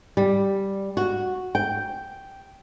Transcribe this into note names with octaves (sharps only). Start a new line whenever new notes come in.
G3
F#4
G5